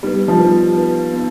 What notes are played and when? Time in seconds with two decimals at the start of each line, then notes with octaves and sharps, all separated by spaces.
0.03 G3 B3 D#4 B4
0.28 F3
0.39 G3 B3 D#4 B4
0.76 B3 D#4 B4
1.13 B3 D#4